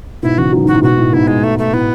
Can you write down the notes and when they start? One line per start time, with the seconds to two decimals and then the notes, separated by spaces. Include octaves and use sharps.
0.23 G#2 B2 E4
0.38 C#3 E3 F#4
0.53 D#3 F#3
0.64 G#2 F#4
0.73 A2
0.83 G#2 B2 F#4
0.98 A2
1.13 G#2 B2 E4
1.28 G#3
1.44 A3
1.59 A3
1.73 A2 B3